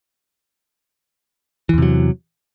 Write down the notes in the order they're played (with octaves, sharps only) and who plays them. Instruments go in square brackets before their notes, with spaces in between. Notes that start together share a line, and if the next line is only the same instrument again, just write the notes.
[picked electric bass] E3
E2
C3
F#3